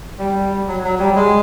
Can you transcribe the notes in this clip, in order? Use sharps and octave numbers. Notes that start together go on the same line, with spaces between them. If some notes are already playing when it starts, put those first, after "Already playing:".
G3
F#3
F#3
G3
G#3